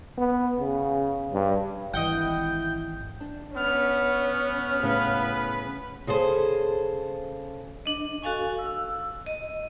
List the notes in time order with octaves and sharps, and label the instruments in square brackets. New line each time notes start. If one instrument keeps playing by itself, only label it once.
[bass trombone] B3
C#3
G2
[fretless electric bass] G#1 E3 [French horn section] E4 [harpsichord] D#5 F#5 [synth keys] G5 G6
[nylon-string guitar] D4
[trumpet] B3 [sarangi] C#4 [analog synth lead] F6
[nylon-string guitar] A2 C#3 [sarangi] B4
[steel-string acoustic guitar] C#3 G#4 A4 C5
[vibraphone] D4 D#5
F#4 A4 F5 G#5 C#6
E6
D#5